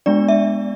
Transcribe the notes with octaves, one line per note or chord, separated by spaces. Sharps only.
G#3 B3 D4 D5
E5